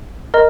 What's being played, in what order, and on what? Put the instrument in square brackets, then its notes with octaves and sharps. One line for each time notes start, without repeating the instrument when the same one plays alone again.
[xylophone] A#4 D#5 A#5 F6